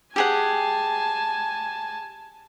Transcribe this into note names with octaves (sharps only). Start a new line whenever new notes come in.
G4 G#4 F#5 G#5 A5